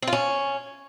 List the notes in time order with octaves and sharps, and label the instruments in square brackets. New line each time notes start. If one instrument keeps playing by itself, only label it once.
[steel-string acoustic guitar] C4
F4
C#4